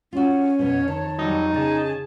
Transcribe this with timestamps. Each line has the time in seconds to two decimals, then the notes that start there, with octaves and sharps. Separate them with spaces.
0.13 C#4 F4 F#4
0.59 F2 B2 B3 C#5
0.88 D#3 A5
1.19 F2 F#3 G3 D#4
1.54 C#3 G#4 G#5 A5